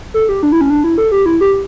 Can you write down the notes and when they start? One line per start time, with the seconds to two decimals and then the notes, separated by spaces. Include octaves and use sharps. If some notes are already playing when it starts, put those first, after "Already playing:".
0.14 A4
0.29 G4
0.43 D4
0.52 E4
0.61 C#4
0.70 D4
0.84 E4
0.98 A4
1.12 G4
1.26 E4
1.41 G4